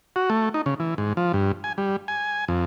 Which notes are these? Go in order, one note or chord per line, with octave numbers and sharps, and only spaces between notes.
F#4
A3
D#4
C#3
E3
G#2
F3
G2
G#5
G3
G#5
F2